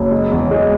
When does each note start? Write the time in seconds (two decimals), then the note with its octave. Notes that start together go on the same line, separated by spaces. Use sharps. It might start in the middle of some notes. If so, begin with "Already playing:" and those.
Already playing: F#1
0.11 G#3
0.31 E2
0.51 G#3